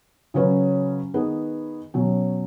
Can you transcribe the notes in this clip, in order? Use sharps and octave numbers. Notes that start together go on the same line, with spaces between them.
C#3 F#3 C#4 B4
D#3 B3 G#4 B4
B2 F#3 C#4